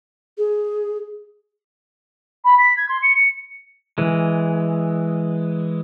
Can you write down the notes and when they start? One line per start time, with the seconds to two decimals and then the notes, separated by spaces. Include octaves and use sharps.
0.38 G#4
2.44 B5
2.58 B6
2.77 G#6
2.89 C6
3.02 C#7
3.15 C#7
3.98 E3 G#3